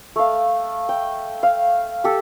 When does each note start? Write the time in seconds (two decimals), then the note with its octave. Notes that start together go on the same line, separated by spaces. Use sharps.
0.16 A3 F5
0.89 G5
1.43 F5
2.04 G4 A4